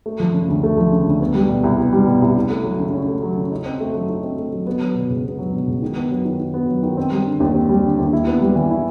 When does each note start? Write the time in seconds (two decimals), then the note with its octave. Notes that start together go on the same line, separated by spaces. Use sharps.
0.06 A3
0.20 F3
0.34 C#3
0.49 D2
0.63 A3
0.78 F3
0.92 C#3
1.07 D2
1.21 B3
1.35 G3
1.49 B2
1.63 C2
1.78 B3
1.93 G3
2.07 B2
2.22 C2
2.36 C#4
2.50 A3
2.64 F#3
2.79 C#3
2.94 C#4
3.08 A3
3.23 F#3
3.37 C#3
3.52 D#4
3.65 C4
3.80 A3
3.95 F#3
4.09 D#4
4.23 C4
4.38 A3
4.52 F#3
4.67 B3
4.81 F#3
4.95 B2
5.10 C#2
5.25 B3
5.39 F#3
5.53 B2
5.67 C#2
5.82 D#3
5.96 B3
6.10 F#3
6.25 D#3
6.39 D#3
6.54 B3
6.68 F#3
6.83 D#3
6.97 C4
7.12 G3
7.26 D3
7.40 D#2
7.54 C4
7.69 G3
7.84 D3
7.98 D#2
8.13 E4
8.27 B3
8.42 G3
8.55 E3
8.71 E4